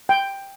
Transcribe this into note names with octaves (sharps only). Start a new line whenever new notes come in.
G5